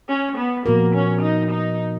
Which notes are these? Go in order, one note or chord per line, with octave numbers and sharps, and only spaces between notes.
C#4
B3
A#2 F3 A#3 B3 F#4 A#4
C#4
D#4
D#4